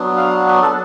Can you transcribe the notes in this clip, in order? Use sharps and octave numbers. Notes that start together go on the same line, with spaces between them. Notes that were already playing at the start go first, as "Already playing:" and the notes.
Already playing: F#3 B3 D4
F5
B4
A4